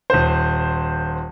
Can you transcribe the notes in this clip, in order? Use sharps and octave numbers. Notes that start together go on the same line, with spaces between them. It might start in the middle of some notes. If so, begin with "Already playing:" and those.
D#1 C5